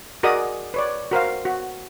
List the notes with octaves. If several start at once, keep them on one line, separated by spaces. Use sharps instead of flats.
F#4 G#4 A#4 D5 D#5 D#6
B4 C#5 D5
F#4 A#4 C5 F5
F#4